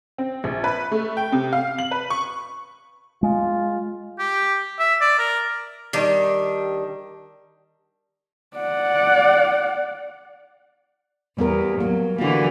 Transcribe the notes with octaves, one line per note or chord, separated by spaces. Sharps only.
C4
A#1
B4
A3
G5
C3
F5
F#7
B4
C#6
G#3 F4
G4
E5
D5
A#4
D#3 G3 D4
D5 F#5
E2 G3 B3 A#4
F#3 A#3
D3 E3 A#3 F#4